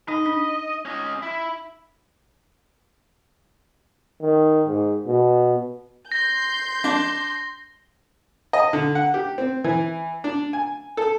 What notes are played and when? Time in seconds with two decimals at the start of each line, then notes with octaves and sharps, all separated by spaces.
0.08 D#4 D#5
0.26 D4
0.85 C#4 D#5
1.23 E4
4.22 D#3
4.68 G#2
5.07 B2
6.12 C6 G6 A#6
6.84 D4
8.53 D#5
8.73 D3
8.95 F#5
9.14 G4
9.38 C4
9.64 E3
10.24 D4
10.53 G#5
10.97 A4